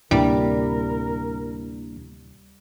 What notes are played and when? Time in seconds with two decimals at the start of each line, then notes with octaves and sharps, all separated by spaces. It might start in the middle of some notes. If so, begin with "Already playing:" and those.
0.11 D2 A2 C3 G3 A#3 D4 E4 A#4